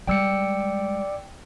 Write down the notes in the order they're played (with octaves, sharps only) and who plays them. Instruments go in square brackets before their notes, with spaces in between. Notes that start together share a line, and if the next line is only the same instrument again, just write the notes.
[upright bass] G3 G#3 [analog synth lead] D5 [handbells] G5 E6 C#7